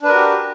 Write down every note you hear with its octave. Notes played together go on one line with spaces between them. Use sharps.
D4 F#4 G4 A#4 B4